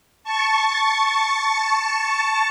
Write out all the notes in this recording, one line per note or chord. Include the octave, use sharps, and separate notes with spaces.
A5 C#6